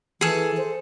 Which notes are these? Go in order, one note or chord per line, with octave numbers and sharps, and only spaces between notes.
E3 G#4 A4
C5